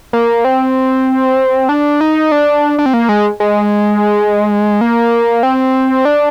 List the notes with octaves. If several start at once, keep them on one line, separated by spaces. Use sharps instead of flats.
A#3
C4
D4
D#4
D4
D4
C4
A#3
G#3
G#3
A#3
C4
D4